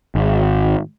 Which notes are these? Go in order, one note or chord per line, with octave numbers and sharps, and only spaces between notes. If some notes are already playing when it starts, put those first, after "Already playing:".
G#1